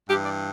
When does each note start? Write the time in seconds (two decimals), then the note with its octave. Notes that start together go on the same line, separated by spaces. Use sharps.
0.09 G2 G4
0.13 E3
0.25 D5